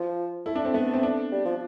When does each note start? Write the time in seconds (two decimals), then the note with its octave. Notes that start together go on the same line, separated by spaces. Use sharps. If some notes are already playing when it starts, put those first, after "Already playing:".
Already playing: F3
0.46 A3 E4
0.55 D4
0.65 C4
0.74 A3 B3
0.94 C4
1.03 D4
1.32 G3
1.45 F3